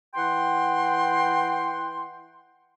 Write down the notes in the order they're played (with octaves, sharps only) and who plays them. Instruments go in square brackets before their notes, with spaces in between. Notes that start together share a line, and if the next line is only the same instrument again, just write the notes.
[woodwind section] E3 F#5 G5 C6